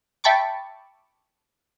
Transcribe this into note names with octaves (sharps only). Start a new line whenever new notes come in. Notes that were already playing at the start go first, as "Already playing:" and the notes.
E5 G5 A5 B5 C#6 D6